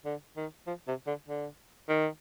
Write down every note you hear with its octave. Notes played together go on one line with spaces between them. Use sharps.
D3
D#3
F3
C3
D3
D3
D#3